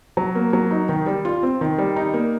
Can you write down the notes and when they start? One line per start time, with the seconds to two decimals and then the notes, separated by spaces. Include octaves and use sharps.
0.17 F#3
0.35 A#3
0.53 F#3
0.71 D#4
0.89 D#3
1.06 G3
1.25 F4
1.43 C4
1.61 D#3
1.78 G3
1.96 D#4
2.14 A#3